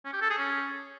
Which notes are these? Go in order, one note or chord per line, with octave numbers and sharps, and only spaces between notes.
C#4
G4
A4
G#4
C#4